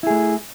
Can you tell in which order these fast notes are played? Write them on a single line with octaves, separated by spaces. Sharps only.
E4 G#4 A3